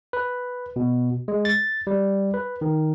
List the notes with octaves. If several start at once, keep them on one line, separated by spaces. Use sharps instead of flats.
B4
B2
G#3
A6
G3
B4
D#3